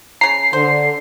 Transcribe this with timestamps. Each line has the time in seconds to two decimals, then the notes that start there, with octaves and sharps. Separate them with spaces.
0.21 C#3 A#5 C7
0.53 D3 C5